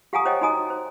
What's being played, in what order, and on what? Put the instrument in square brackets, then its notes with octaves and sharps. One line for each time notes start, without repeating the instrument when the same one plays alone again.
[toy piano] G4 F5 F#5 G#5 A#5 D#6
C5 C#5 D#5 F#5 G5
D#4 F#4 D#5 G#5 A#5 D#6
C5